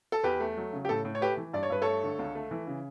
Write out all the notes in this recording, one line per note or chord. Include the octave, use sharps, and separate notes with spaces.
A4
E2 G4 B4
A3
F#3
C#3
G4
A2 A4
A2
C#5
A3 G4 B4
E3
G2 D5
C#5
G2 B4
A3 A4 C#5
D3
C#2
A3
E3
C#3